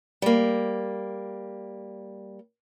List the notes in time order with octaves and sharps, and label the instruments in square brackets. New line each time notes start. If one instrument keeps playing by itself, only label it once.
[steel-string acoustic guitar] G3 A#3